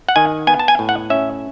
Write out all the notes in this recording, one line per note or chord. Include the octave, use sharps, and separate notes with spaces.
F#5
D#3 G#5
B3 G#5
A5
G#5
A2
F#5
C#4 E5